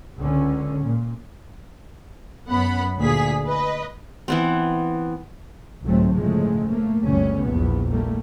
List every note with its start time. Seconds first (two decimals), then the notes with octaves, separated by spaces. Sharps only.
0.18 C#2 D3 C#4
0.83 A#2
2.47 F#2 B3 F#5 B5
2.99 D2 A#2 G#4 B6
3.46 B4 D#5
4.28 E3 B3 C4
5.83 G1 C2 G#2 F#3 A3 C4
6.15 A2 C#3 F3 G#3 A3
6.69 A3 A#3
7.04 G1 D2 C#3 G3 C#4
7.45 A#1 E2 G2 B3
7.90 G3 A3 A#3